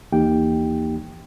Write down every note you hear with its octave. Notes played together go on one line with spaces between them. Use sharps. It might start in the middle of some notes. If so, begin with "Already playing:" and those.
D#2 E3 A#3 D#4 G4 G5